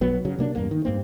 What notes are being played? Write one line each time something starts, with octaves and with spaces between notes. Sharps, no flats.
B1 F#3 B3
C#3 F#3
C3 A#3 D4
E2 G2 A#3
D#3
G2 A#3 C4